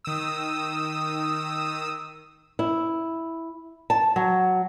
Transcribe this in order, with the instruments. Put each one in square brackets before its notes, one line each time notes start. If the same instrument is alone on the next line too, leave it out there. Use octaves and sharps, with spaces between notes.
[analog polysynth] D#3 D#6 E6
[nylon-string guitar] E4
A5
F#3